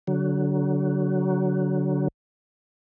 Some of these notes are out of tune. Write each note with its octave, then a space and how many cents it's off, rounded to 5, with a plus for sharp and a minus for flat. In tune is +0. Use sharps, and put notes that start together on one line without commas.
D3 -25 F#3 +15